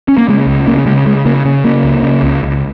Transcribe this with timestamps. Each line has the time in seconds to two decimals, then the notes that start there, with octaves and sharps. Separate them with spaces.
0.08 C#4
0.18 A#3
0.28 C#3 G#3
0.47 C#2
0.67 C#3 A#3
0.86 C#3 G#3
1.06 C#3 G#3
1.25 C#3 A#3
1.45 C#3
1.64 C#3 A#3
1.84 C#2
2.03 C#3
2.23 C#2
2.43 C#2